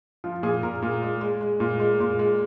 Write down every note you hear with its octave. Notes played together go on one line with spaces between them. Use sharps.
F3 F4
A#2 G#4
A#2 A#4
A#2 G#4
G#3
G#3
G#3
A#2
G#3
A#2
G#3